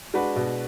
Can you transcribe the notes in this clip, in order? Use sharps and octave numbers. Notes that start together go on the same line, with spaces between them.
G#3 D4 F#4 B4
B2